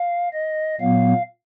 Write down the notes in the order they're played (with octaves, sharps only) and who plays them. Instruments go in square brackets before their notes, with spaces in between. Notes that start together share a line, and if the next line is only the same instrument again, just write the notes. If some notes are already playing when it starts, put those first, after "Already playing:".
Already playing: [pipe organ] F5
D#5
A#2 F#3 B3 F5